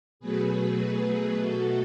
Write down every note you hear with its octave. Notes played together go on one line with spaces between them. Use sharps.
B2 F#3 A3 G#4 B4
B2 A3 F#4 A4